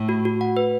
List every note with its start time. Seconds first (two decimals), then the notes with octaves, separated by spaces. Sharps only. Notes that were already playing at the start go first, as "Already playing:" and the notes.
Already playing: A2
0.09 F#4
0.25 F#4
0.41 F#5
0.57 B4